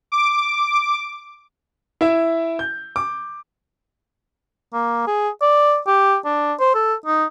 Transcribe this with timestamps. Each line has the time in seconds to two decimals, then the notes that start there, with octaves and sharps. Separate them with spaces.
0.12 D6
2.01 E4 E5
2.59 G6
2.96 D6
4.74 A#3
5.07 G#4
5.42 D5
5.87 G4
6.25 D4
6.60 C5
6.75 A4
7.06 D#4